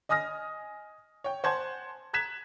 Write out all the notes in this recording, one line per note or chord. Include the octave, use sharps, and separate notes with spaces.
D#5 G#5 D#6 F6 A#6
C#5 G5
C5 F#5 G#5 A5 C6 G#6
A#5 F#6 G#6 B6 E7